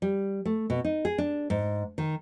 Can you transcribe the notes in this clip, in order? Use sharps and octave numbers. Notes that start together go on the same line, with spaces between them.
G3
A3
B2
D#4
G#4
D4
G#2
D#3